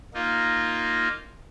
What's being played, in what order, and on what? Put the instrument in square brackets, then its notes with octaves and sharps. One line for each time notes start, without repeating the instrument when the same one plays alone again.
[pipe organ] A#3 D#4 F4